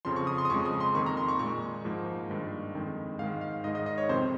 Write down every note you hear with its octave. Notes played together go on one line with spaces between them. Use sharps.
F2 C#3 F3 C6
C#6
D#6
C6
D#6
F2 C#3 F3 G#3 C#6
D#6
C6
F2 D#3 A#3 C#6
A#5
C6
C#6
A#2 G#3 C#6
G#2 F3 A#3
G2 D#3 G#3
F2 D#3 G#3
G#2 D#3 G#3 F5
F5
G#2 D#3 G#3 D#5
D#5
D#5
C#5
F2 C3 D#3 C5